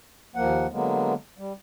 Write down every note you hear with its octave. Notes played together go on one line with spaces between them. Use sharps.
D#2 F3 A#3 F#5
D3 F#3 G#3 A#3 B3
G3